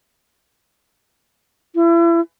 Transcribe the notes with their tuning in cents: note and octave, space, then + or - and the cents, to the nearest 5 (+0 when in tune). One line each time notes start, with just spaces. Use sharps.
E4 +35